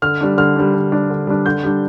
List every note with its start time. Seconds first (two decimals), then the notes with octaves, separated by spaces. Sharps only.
0.02 D3 F6
0.21 G3 D4
0.38 D3 F6
0.56 G3 D4
0.74 D3
0.92 G3 D4
1.10 D3
1.27 G3 D4
1.46 D3 G6
1.64 G3 D4